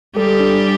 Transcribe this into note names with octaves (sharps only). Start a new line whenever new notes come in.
G3 G4 A4
D4